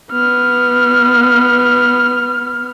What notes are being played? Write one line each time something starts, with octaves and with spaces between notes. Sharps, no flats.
B3 F6